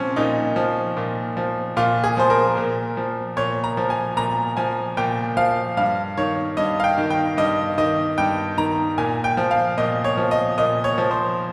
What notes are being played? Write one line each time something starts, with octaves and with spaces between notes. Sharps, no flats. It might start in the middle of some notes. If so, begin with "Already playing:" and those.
Already playing: A#2 F3 C4 C#4
A#2 D#4
F3
A#2
F3
A#2 F4
G#4
F3 C5
A#4
A#2
F3
A#2 C#5
A#5
F3
G#5
A#2 A#5
F3 G#5
A#2 G5
F3 F5
G2 F5
D#3 C#5
G2 D#5
F5
G5
D#3
G5
G2 D#5
D#3 D#5
G2 G5
D#3 A#5
A#2 G#5
G5
F3
F5
A#2 D#5
C#5
F3
D#5
A#2 D#5
C#5
F3
C5